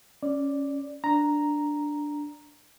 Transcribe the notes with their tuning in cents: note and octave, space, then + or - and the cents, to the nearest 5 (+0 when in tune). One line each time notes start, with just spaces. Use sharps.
C#4 +0 D5 +0
D4 +0 A#5 +0